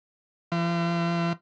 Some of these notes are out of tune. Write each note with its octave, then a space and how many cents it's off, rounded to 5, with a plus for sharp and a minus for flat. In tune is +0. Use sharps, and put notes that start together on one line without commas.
F3 -45